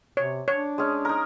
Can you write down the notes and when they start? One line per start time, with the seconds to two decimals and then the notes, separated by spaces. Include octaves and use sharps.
0.17 C3 C#5
0.48 D4 C#5
0.78 G#3 C#4
1.05 D#4 A#4